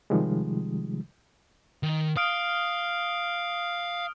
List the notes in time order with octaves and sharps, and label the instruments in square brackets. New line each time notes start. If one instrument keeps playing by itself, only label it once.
[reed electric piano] C3 D#3 F3 G3 G#3
[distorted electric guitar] D#3
[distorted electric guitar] F5 [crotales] D#6 F6 D7